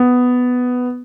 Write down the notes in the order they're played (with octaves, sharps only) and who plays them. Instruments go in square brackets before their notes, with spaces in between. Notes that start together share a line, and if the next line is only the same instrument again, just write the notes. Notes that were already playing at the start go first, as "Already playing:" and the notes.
Already playing: [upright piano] B3